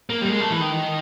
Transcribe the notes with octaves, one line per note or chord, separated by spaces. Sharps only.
A#3
G3
G#3
A3
E3
D#3